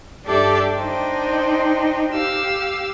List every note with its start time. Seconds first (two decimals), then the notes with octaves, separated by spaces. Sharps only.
0.24 G2 D4 G4 A4 D5 E5
0.77 D4 D#4 C5 G5
2.13 G4 F5 E6